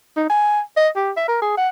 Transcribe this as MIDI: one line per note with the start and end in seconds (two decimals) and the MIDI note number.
0.16 0.25 63
0.30 0.60 80
0.77 0.88 75
0.96 1.11 67
1.17 1.27 76
1.28 1.40 70
1.42 1.56 68
1.57 1.69 78